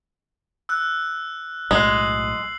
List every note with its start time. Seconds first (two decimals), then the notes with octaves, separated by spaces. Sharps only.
0.69 E6 F#6
1.71 B1 A2 G#3 C7 F#7